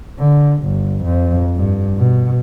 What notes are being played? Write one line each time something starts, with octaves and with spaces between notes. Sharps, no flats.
D3
G1
F2
G2
B2